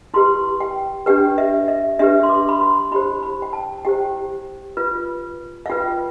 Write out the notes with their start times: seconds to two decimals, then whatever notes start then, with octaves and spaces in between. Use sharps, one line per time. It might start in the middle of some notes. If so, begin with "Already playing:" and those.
0.14 E4 G4 B4 C6
0.61 G5
1.06 D4 G4 B4 G5
1.38 E5
1.68 E5
1.99 D4 G4 B4 E5
2.23 C6
2.29 D6
2.49 B5
2.61 C6
2.91 E4 G4 C5 B5
3.23 B5
3.42 G5
3.53 A5
3.85 E4 G4 C5 G5
4.77 F4 B4
5.66 F5
5.70 F4 B4 G5